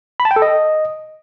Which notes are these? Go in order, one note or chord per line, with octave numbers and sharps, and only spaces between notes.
B5
A5
G5
A4
D#5